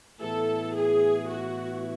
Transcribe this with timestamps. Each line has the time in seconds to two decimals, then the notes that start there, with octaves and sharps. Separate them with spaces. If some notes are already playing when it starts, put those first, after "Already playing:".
0.20 A2 E3 B3 E4 A4
0.75 G#4
1.30 F#4